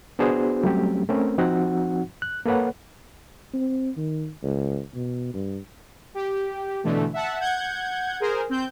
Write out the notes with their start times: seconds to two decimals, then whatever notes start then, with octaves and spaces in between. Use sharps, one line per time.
0.19 B3 D4 F#4 G#4 C5
0.63 F#3 G3 A3 C4 C#4 G4
1.09 A3 C4 C#4 A#4
1.38 F3 C4 D#4 F#4 F#5
2.22 F#6
2.46 A#3 A4 B4 C#5 F#5
3.54 C4
3.97 D#3
4.43 C#2
4.94 B2
5.34 G2
6.15 G4
6.84 B2 D3 E3 A3
7.13 E5 F#5 A5
7.40 F#5 G6 G#6
8.20 G#4 A#4 C5
8.50 C4 G6